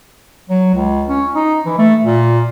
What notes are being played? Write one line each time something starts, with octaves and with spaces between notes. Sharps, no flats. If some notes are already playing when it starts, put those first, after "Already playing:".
F#3
C#2
C#4
D#4
E3
A3
A#2